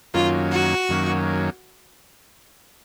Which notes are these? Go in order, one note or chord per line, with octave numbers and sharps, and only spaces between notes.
F#2 D#3 F#3 A#3 C#4 F4
F#4
F#2 D#3 F#3 A#3 C#4